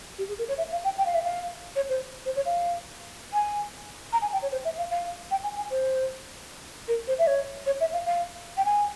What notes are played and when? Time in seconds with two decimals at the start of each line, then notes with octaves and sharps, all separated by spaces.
0.18 G4
0.28 G#4
0.38 A#4
0.48 C#5
0.58 E5
0.72 F5
0.84 G5
0.98 G5
1.05 F5
1.14 E5
1.23 F5
1.76 C#5
1.89 C5
2.26 C5
2.36 C#5
2.46 F5
3.33 G#5
4.12 A#5
4.22 G#5
4.33 G5
4.42 C#5
4.52 C5
4.65 E5
4.78 F5
4.91 F5
5.31 G5
5.43 G#5
5.57 G#5
5.70 C5
6.88 A#4
7.08 C5
7.19 E5
7.27 C#5
7.66 C#5
7.80 E5
7.93 F5
8.06 F5
8.57 G5
8.65 G#5